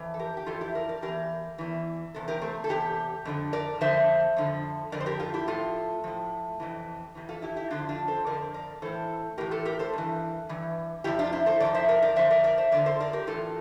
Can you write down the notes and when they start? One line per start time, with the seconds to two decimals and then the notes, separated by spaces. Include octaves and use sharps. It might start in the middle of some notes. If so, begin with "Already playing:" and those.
Already playing: F2 E3
0.14 A4
0.19 G4 A#4
0.37 G4
0.46 F2 E3 F4 A4
0.61 E4 G4
0.75 A#4 D5
0.89 A#4 D5
1.02 E2 E3 G4 A#4
1.58 E2 E3
2.14 E2 C3 A4
2.28 G4 A#4
2.42 A3 C4
2.64 A4
2.69 E2 C3 G4
3.25 F2 D3 F3
3.53 A#4 D5
3.81 F2 D3 F3 C5 E5
4.37 F2 D3 F3
4.92 F2 D3 F3 A#4 D5
5.00 C5
5.06 G4 A#4
5.20 F4 A4
5.34 E4 G4
5.47 A2 F3 F4 A4
6.04 A2 F3
6.60 F2 C3 E3
7.15 F2 C3 E3
7.29 F4 A4
7.42 E4 G4
7.56 E4 G4
7.71 F2 D3 F3 D4 F4
7.89 D4 F4
8.08 A4 C5
8.26 F2 D3 F3 A#4 D5
8.54 A#4 D5
8.82 A2 E3 A4 C5
9.38 A2 E3 G4 A#4
9.51 F4 A4
9.65 G4 A#4
9.79 A4 C5
9.93 G2 E3
10.49 G2 E3
11.04 F2 C3 F3 E4 G4
11.19 D4 F4
11.33 C4 E4
11.46 A4 C5
11.60 F2 C3 F3 D5
11.75 C5 E5
11.89 A#4 D5
12.02 A#4 D5
12.16 F2 D3 F3 C5 E5
12.31 A#4 D5
12.44 A#4 D5
12.58 C5 E5
12.72 F2 D3 F3 A#4 D5
12.86 A4 C5
13.00 A#4 D5
13.13 G4 A#4
13.27 A2 E3 F4 A4